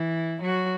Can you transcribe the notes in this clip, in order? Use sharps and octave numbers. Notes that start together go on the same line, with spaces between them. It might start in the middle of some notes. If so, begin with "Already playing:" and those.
Already playing: E3 E4
F#3 F#4